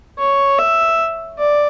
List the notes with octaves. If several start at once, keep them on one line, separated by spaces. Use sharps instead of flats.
C#5
E5
D5